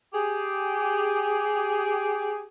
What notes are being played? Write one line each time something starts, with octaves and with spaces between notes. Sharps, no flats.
G4 G#4